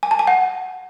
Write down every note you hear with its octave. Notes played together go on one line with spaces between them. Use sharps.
G#5
A5
G#5
F#5